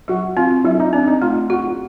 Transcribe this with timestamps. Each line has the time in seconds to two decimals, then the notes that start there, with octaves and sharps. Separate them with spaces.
0.08 F#3 F#4
0.37 C4 F4
0.64 F#3 E4
0.75 E4
0.80 D#4
0.93 C4 D4
1.07 D#4
1.22 A3 F4
1.50 F4 F#4
1.67 F#4